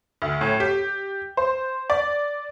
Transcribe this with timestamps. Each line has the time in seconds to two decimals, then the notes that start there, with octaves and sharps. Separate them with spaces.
0.22 D2
0.41 A2
0.60 G4
1.37 C5
1.90 D5